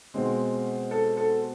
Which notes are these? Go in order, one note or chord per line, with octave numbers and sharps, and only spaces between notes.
B2 G#3 C4
A4
A4